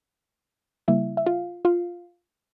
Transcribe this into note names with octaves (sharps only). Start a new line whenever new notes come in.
C#3 G3 A#3 E4 E5
E5
F4 F5
F4 F5